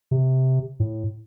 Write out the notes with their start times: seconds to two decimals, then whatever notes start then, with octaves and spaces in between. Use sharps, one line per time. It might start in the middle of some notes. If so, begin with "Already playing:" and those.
0.11 C3
0.80 A2